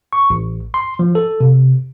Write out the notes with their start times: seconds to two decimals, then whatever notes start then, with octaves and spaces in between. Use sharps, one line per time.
0.13 C#6
0.30 A1
0.74 C6
0.99 F3
1.15 A4
1.40 C3